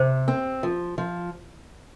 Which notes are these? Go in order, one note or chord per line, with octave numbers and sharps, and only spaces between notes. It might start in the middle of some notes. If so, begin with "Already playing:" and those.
Already playing: C3 C5
C4
F3
F3